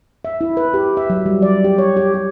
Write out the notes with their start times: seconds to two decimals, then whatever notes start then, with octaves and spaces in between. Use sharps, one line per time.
0.25 E5
0.41 E4
0.57 B4
0.74 G4
0.97 E5
1.10 F#3
1.26 G3
1.42 D5
1.64 G4
1.78 C#5
1.97 G4
2.14 G4